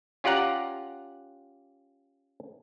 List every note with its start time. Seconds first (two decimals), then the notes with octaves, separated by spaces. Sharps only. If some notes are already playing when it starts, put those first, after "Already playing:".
0.24 C#4 F4 G4 D5 F#5 A#5